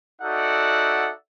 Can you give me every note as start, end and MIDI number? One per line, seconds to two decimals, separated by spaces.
0.22 1.11 63
0.22 1.11 66
0.22 1.11 69
0.22 1.11 74
0.22 1.11 76
0.22 1.11 78